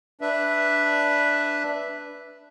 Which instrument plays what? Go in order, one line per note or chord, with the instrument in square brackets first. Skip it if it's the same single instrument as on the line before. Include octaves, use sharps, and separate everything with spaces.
[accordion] D4 B4 E5